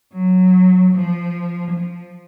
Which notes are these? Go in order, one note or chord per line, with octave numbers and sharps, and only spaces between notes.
F#3
F3
F3